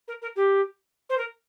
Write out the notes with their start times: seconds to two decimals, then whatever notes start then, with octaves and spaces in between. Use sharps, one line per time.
0.07 A#4
0.21 A#4
0.35 G4
1.09 C5
1.17 A#4